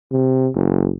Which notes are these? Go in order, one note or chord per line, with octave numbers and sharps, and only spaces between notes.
C3
F#1